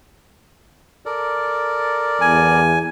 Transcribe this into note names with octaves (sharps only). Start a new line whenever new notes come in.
A4 A#4 D5
E2 G#5